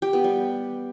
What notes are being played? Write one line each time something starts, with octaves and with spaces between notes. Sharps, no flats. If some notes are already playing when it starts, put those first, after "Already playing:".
G4
B3
G3